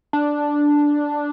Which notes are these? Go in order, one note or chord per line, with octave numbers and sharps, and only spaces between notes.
D4